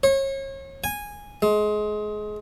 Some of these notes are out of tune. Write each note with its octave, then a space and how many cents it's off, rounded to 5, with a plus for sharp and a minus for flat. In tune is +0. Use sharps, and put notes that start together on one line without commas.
C#5 -35
G#5 -10
G#3 +25